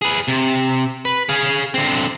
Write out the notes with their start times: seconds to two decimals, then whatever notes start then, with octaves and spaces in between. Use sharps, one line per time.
0.02 G#4 B4
0.28 C3
1.05 B4
1.29 G#4 F5
1.74 D3 C4